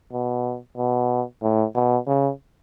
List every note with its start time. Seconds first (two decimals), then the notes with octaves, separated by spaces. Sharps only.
0.12 B2
0.77 B2
1.42 A2
1.75 B2
2.08 C#3